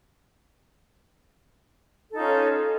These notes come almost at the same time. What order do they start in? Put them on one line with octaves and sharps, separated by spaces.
A4 D#4 F4 C#4